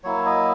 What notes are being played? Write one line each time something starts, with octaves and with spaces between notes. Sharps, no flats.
F#3 A#3 E4 C#5
D#5